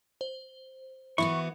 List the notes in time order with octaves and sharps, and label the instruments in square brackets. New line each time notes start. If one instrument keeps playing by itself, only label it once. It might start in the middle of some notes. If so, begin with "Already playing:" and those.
[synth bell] C5
[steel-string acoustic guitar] E3 B3 F#4 [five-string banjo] E4 [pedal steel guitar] C#6